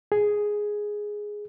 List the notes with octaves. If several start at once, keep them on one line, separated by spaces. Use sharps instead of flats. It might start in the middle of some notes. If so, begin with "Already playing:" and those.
G#4